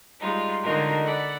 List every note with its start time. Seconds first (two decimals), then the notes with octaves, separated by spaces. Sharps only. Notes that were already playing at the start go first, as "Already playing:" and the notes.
0.20 G3 G#3 D#4 F4
0.62 D3 G#3 D#4 F4 F#4 A#4
1.02 A4 D5 F#5 B5